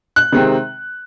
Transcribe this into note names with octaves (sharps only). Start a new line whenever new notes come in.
F#6
C3 D#3 G#3 C4